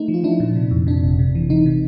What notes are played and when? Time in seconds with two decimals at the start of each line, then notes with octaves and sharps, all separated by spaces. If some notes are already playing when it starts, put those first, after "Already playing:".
Already playing: A3 D#4
0.08 F3
0.14 F4
0.24 F3 D4 E4
0.40 A#2
0.55 C3
0.71 F2
0.87 C3 D4
1.03 G1
1.19 C3
1.35 E3
1.50 E3 D#4
1.66 C3